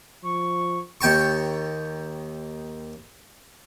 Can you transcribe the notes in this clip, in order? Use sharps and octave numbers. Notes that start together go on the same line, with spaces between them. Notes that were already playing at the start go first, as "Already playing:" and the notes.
F3 C#6
D#2 G5 A5 C#6